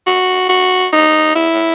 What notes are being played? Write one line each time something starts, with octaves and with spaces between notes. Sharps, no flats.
F#4
F#4
D#4
E4